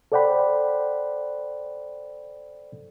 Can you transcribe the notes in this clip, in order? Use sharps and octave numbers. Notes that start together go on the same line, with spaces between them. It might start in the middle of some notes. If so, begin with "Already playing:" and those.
A4 C5 D5 F#5 G5 B5